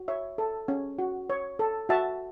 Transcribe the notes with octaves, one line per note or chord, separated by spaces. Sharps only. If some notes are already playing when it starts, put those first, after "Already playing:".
Already playing: F#4
C#5 E5
A4
C#4
F#4
C#5
A4
F#4 E5 A5